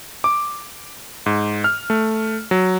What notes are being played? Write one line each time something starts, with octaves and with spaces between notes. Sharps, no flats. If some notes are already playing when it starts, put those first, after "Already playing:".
D6
G#2
F6
A3
F#3